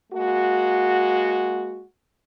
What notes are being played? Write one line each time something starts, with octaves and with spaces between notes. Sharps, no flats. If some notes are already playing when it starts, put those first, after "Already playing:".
G#3 A#3 F#4